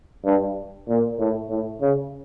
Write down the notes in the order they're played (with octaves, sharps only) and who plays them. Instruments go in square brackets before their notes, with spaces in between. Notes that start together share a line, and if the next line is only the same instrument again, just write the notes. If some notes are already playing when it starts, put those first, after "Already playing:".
[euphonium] G2
A#2
A2
A2
C#3